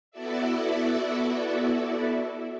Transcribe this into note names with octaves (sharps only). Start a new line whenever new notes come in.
B3 E4 F#4 A4 D5 E5